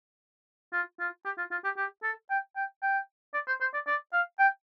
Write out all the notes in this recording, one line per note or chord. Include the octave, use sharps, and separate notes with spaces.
F4
F4
G4
F4
F4
G4
G4
A4
G5
G5
G5
D5
C5
C5
D5
D5
F5
G5